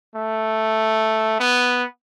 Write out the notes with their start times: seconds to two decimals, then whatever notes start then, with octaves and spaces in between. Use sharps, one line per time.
0.16 A3
1.40 B3